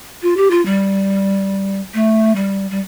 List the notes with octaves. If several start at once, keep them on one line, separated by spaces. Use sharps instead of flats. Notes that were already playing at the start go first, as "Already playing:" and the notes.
F4
G4
F4
G3
A3
G3
G3